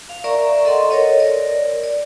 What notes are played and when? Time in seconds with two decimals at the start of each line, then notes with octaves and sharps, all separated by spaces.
0.09 F5
0.24 A#4 D5 E5 A#5 C#6
0.65 A4 D#5 F#5 C6
0.90 A4 A#4 C#5 D#5
1.20 A#4 D5
1.84 D5